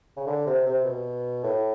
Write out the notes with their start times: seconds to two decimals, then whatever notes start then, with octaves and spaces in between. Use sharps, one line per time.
0.17 C#3
0.27 D3
0.47 C3
0.66 C3
0.85 B2
1.44 A2